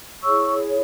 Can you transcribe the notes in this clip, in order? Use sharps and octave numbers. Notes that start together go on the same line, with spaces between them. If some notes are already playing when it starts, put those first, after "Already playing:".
E4 G#4 C#5 C#6 E6